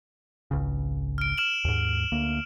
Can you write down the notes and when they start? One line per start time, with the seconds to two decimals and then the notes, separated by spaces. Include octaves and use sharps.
0.51 G#1 C#2 C#3
1.18 F6 D7
1.38 F6 E7 F#7
1.65 D#2 G#2
2.12 D2 A#3